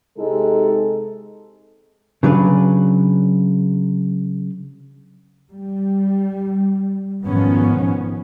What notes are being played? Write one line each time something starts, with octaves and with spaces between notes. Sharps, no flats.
C3 G#3 D#4 A4
C#3 F#3 D4 B4
G3
G#2 B2 D#3 F3 B3 C#4